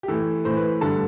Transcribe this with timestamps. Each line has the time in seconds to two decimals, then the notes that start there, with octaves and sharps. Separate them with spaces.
0.03 G4
0.08 A2 E3 A4
0.45 A2 E3 C5
0.57 B4
0.81 G2 D3 A5